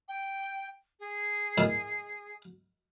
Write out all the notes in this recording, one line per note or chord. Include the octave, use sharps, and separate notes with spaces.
G5
G#4
A2 D#3